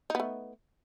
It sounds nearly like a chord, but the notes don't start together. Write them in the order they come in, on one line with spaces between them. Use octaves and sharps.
D#4 B3 A3